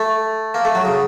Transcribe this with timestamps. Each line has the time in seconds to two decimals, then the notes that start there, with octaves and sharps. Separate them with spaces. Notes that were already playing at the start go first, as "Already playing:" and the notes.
Already playing: A3
0.54 A#3
0.65 A3
0.75 F#3
0.85 C#3